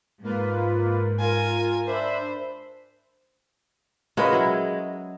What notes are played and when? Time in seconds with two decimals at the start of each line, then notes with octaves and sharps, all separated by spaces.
0.24 G#2 A#3 F4 B4
1.19 F4 A#4 G#5
1.87 D4 C5 E5 B5
4.17 G#3 C#4 F4 F#4 A#4 B4 D#5
4.33 F#3 E4